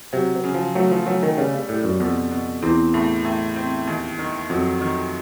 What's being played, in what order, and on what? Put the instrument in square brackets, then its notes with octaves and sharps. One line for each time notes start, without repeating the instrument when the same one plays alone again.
[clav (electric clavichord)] C3 [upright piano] F#3
[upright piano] C#3
[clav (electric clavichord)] F3
[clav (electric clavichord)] F#3 [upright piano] A3
[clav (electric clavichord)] F3
[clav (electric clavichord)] F#3 [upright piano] A3
[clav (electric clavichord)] D#3
[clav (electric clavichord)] C#3 [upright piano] G3
[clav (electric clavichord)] A2 [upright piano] G3
[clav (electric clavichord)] F#2
[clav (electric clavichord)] F2 [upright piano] B2
[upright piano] B2
[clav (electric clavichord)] E2 [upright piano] C4
[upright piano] A2
A2
C4
D#2
D#3
[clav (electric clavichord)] F2 [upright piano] F#3
[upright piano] D#3